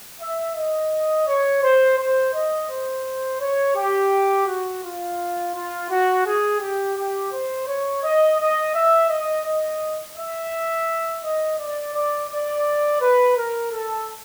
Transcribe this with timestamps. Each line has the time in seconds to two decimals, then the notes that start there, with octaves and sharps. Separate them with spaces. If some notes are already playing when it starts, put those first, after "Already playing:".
0.20 E5
0.55 D#5
1.27 C#5
1.62 C5
1.97 C5
2.33 D#5
2.69 C5
3.41 C#5
3.76 G4
4.47 F#4
4.83 F4
5.54 F4
5.89 F#4
6.25 G#4
6.60 G4
6.95 G4
7.31 C5
7.67 C#5
8.02 D#5
8.38 D#5
8.74 E5
9.09 D#5
9.45 D#5
10.16 E5
11.23 D#5
11.59 D5
11.94 D5
12.29 D5
13.01 B4
13.36 A#4
13.72 A4